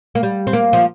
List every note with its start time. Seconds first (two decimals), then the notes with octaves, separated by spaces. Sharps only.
0.15 A#3
0.23 G3
0.47 C4
0.53 A#3
0.73 F3